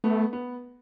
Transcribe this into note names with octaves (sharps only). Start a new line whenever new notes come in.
A3 B3
B3